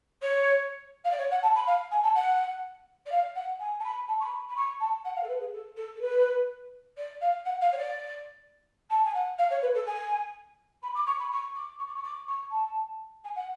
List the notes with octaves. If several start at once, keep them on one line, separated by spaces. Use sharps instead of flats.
C#5
F5
D5
C#5
F#5
A5
B5
F5
G#5
A5
F#5
D5
F5
F#5
G#5
A5
B5
A5
C#6
B5
B5
C#6
A5
F#5
F5
A4
B4
G#4
A4
A4
A4
B4
D5
F5
F#5
F5
C#5
D5
A5
G#5
F#5
F5
C#5
B4
A4
G#5
B5
D6
C#6
B5
C#6
D6
C#6
D6
C#6
D6
C#6
A5
G#5
F#5